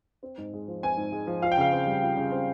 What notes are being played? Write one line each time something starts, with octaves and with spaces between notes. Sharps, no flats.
C4
G#2
G#3
F3
C4 G#5
G#2
G#3
F3
F4 F5
G5
C#3 F5
C4
G3
F4
C#3
C4